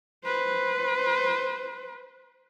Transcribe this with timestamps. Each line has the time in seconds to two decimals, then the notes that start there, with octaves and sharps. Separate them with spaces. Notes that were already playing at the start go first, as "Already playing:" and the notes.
0.24 B4 C5